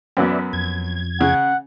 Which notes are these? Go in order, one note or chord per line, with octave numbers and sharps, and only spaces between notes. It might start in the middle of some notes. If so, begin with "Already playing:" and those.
F#2 F#3 B3 B4 D5 E5
F2 G#6
C#3 F#5